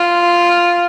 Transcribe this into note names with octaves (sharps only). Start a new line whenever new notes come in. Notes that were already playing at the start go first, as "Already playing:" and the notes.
Already playing: F4